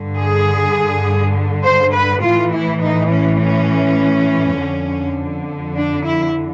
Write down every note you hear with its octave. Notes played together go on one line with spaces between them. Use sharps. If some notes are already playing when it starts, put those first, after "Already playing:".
Already playing: G2 D3
G#4
C5
B4
A2 E3 F4
E4
D#4
C#4
C#4
F2 D3
D4
E4